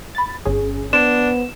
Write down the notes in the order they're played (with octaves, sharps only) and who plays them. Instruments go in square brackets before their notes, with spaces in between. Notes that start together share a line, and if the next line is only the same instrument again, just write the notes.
[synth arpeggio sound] B5 A6
G1 C#4 G#4
[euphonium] B3 [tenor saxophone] D4 [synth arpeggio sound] C5 [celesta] E7